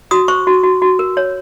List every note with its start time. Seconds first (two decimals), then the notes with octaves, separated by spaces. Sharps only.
0.11 F#4 D#6
0.28 C5 C#6
0.47 F#4
0.64 F#4
0.82 F#4
0.99 A#4
1.17 C#5